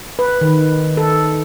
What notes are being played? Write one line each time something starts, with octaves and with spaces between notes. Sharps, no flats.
B4
D#3
A4